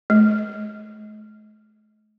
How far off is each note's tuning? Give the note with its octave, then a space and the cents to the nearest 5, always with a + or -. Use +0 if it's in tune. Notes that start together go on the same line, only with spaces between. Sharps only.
A3 -45